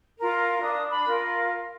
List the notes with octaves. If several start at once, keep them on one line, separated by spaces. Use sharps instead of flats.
F4 A#4
D4 D#6
B5
F4 A#4